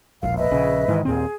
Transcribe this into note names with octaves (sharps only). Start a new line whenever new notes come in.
E1 A#1 F5
B4 D#5 E5
A#1 C#3
G#2 D#3 E3
D#2 A#2 C4 G#4